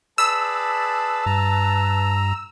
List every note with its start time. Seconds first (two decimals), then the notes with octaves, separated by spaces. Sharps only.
0.18 G#4 B4 D5 A5 B5 E6
1.26 G2 A#5